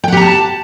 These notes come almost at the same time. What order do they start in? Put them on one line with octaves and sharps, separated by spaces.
G5 F#5 G4 A#5 A5